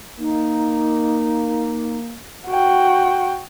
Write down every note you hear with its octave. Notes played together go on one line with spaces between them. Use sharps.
A#3 D#4
F#4 G5